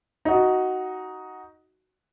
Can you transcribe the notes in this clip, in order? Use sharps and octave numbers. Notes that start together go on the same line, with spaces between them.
D#4 F#4